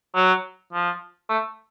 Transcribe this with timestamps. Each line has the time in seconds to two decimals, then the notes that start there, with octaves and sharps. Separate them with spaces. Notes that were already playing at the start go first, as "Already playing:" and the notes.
0.16 F#3
0.73 F3
1.29 A3